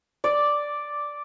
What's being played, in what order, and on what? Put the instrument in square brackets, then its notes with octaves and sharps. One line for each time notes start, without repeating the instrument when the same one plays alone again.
[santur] D5